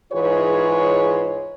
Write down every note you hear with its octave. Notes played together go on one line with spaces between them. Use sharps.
G#2 E3 F4 G#4 B4 C#5